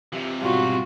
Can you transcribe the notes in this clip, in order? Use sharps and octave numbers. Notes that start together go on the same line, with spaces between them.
C3 E3 F4 G4 E5
G#2 B2 G3 F4 F#4